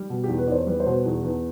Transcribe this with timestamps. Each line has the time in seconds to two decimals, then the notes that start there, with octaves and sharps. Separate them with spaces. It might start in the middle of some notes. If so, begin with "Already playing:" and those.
Already playing: G3
0.10 B2
0.24 G4
0.28 E2
0.38 B4
0.47 E2 C5 D5
0.67 G3 B4
0.80 C5
0.86 B2
0.92 B4
1.06 E2
1.24 E2 B4